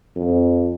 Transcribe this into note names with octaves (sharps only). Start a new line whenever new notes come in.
F2